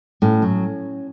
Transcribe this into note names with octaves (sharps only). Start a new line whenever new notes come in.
A2 C#4
F#3